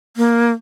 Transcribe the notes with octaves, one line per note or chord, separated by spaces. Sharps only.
A#3